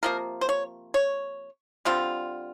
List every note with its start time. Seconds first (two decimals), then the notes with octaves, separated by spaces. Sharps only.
0.03 C3 F3 A#3 A#4
0.41 C5
0.49 C#5
0.94 C#5
1.85 D3 G3 C4 F4